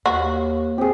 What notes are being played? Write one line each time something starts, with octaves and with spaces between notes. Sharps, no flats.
D#2 A#3 F#4
C4 G4 G#4